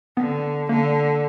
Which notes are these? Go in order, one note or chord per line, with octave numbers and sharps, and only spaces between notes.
D3 B3
D3 A#3